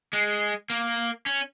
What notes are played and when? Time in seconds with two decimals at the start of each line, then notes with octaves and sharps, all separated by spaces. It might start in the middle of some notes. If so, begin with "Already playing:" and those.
0.13 G#3
0.70 A#3
1.26 C#4